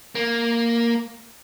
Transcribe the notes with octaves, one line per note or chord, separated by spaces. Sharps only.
A#3